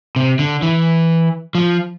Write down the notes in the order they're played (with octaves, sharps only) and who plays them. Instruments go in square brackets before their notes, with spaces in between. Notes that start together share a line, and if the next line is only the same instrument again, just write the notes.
[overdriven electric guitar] C3
D3
E3
F3